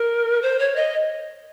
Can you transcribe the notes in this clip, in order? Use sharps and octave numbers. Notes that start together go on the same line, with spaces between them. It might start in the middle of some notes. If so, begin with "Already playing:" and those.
Already playing: A#4
C5
C#5
D#5